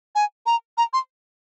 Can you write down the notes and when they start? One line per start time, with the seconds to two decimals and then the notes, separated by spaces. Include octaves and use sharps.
0.15 G#5
0.46 A#5
0.78 A#5
0.93 C6